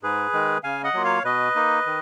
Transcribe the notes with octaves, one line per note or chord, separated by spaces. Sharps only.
G#2 G#4 B4
D#3 G#3
C#3 F5 G#5
D#5 F#5
F#3 A#3 F4
C#5 F5
B2 B4 D#5
A#3 D#4
D#3